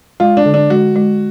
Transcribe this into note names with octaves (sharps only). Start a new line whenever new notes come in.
G#3 F4
D4
D3
D4
G#3 F#4
G#3